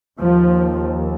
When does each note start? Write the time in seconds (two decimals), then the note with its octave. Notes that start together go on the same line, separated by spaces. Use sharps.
0.20 D#2 F3